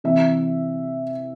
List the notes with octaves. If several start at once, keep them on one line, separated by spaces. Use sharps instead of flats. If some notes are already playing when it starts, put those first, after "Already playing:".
C3 E3 E5